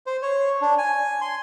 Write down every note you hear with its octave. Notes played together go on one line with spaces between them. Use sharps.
C5
C#5
D4
G#5
C6